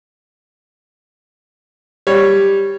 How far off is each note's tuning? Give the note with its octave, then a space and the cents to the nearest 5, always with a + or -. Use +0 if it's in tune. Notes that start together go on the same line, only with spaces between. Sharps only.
G3 +5 C#5 +0